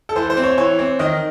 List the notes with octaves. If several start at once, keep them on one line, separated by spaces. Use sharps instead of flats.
A4
E3 C5
C5
C4
C#5
E3 C#5
C4
D#3 D#5